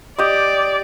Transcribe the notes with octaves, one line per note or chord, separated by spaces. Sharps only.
G4 D5 D#5